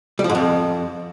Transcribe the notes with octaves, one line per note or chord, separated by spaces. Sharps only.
G3
F3
G#2
F2